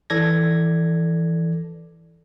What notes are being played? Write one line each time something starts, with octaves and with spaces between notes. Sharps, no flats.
E3 A4 D5 G#6 A#6